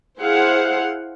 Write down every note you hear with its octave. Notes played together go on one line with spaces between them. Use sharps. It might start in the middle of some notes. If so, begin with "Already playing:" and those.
E4 G#4 C5 F5 F#5